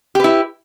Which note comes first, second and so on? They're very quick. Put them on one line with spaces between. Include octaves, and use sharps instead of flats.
G4 B4 E4